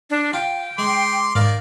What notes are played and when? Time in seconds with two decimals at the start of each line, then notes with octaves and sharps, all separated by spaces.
0.10 D4
0.33 F4 G5
0.78 G#3 C6 D6
1.35 G#2 D#3 A#4 D5 F5